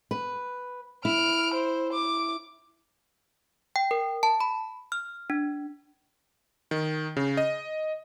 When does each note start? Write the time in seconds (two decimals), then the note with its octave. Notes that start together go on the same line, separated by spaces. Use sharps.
0.11 B4
1.05 E4 F6 D7
1.54 C5
1.93 D6
3.76 G5
3.91 A#4
4.23 A5
4.40 B5
4.92 F6
5.30 D4
6.71 D#3
7.17 C#3
7.37 D#5